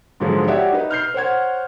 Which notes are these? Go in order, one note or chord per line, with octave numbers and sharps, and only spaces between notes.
G#2 D3 F3 F#3 G#3
F#4 G4 C#5 D5 E5 F#5
D#4 B4
F6 G6 C7
C5 C#5 F#5 G#6